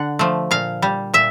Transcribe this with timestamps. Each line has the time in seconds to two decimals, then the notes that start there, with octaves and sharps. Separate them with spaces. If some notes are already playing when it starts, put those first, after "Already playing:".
Already playing: D3 F#5
0.19 F3 A3
0.51 A#2 F5
0.82 G3
1.14 A#2 E5